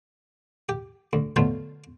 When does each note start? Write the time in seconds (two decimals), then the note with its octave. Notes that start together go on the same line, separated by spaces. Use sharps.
0.69 G4
1.13 D2
1.36 B2 D3 F#3 A3 F4 F5